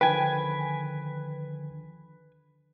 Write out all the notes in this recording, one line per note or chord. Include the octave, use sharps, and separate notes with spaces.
D3 D#3 F3 B4 G5 G#5